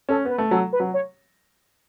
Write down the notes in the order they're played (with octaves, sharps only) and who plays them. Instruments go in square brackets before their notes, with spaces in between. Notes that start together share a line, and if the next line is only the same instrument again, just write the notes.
[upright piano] C#4 [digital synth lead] A4
[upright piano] B3 [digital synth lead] B4
[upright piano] A3
[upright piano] F#3 [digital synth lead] A4
[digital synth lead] B4
[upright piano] F#3
[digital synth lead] C#5